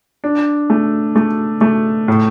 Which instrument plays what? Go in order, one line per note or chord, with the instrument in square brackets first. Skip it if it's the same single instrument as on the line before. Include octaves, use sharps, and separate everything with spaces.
[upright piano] D4
A3
A3
A3
A2